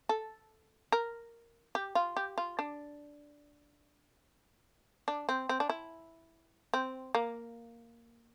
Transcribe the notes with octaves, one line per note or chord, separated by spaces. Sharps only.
A4
A#4
G4
F4
G4
F4
D4
D4
C4
C4
D4
E4
C4
A#3